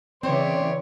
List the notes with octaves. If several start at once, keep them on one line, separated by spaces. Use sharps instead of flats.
C#3 E3 C4 C#5 D5 C6